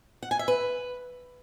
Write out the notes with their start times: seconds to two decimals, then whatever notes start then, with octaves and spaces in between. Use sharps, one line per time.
0.22 F#5
0.31 G#5
0.39 E5
0.48 B4